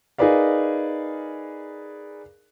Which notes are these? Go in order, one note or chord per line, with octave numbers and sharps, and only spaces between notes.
D#4 G#4 A#4 B4 D5 F5